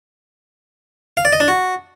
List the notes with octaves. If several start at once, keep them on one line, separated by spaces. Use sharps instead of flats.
F5
D5
D#5
D4
F#4